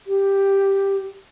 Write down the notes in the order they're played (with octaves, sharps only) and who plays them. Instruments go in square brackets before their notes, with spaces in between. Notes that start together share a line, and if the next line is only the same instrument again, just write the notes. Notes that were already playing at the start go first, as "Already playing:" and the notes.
[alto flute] G4